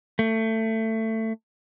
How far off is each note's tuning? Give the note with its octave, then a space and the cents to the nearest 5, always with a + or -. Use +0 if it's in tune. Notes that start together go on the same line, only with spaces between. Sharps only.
A3 +20